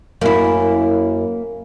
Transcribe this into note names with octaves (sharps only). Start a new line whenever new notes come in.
F#2 A#3 E4